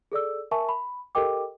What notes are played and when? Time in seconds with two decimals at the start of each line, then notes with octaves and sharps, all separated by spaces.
0.12 G#4 A4 D5 E6
0.51 A#4 E5 G#5 A5 C#6
0.69 B5
1.15 G4 A4 A#4 D#5 G5 D6